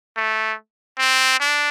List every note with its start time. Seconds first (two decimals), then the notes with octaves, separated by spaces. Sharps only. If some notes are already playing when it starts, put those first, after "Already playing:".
0.17 A3
0.99 C4
1.40 D4